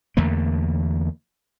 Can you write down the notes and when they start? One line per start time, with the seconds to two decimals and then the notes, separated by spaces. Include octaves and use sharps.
0.17 E2 D3 A3 A#3